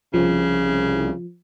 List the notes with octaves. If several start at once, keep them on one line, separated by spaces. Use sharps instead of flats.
C2 C#3 F3